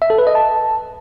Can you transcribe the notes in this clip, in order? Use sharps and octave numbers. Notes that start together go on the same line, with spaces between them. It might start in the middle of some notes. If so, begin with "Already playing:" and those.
E5
A4
B4
D#5
A5